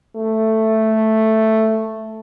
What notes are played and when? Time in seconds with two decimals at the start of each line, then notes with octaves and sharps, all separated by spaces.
0.16 A3